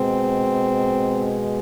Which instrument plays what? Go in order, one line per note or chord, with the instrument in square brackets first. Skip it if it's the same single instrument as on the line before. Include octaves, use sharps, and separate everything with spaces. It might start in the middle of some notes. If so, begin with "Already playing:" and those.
Already playing: [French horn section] B2 G#3 C4